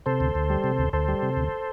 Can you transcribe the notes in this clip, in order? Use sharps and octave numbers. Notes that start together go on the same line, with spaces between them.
C3 A4 C5
D2
D2
G3
C3
D2
D2 A4 C5
G3
C3
D2